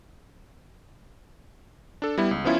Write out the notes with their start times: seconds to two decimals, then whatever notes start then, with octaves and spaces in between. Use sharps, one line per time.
2.02 D4 A4
2.18 G3 B3 E4
2.31 C#2
2.45 F3 B3 C#4 E4 F4